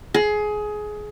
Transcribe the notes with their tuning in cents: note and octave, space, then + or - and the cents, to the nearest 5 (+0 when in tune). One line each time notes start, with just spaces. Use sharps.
G#4 +20